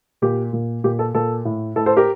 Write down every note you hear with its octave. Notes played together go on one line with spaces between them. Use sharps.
A#2 G4
A#2
A#2 G4
A4
A#2 A4
A2
A2 A4
A4 C5
G4 A#4